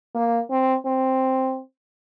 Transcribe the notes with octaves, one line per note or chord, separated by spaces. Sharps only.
A#3
C4
C4